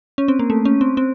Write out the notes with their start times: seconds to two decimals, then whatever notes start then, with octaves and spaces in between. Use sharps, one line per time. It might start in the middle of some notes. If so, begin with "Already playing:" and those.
0.18 C#4
0.28 C4
0.39 A#3
0.50 A3
0.65 C#4
0.81 C4
0.97 C4